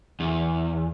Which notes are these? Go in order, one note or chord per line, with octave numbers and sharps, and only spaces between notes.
E2